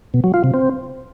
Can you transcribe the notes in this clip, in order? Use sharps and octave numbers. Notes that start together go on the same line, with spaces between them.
B2
F#3
F4
C3
C4